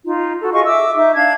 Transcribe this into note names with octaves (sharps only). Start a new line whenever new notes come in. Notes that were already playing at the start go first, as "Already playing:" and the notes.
D#4 F4
F#4 A4
F4 G#4 D#5 C#6
E5 D6 E6
D#4 E5
D4 F5 G#6